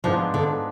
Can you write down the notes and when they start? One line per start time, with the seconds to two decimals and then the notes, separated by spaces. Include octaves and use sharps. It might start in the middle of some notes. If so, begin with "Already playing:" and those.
0.04 G#2 F3 G#3 B3 D4 F4
0.34 D3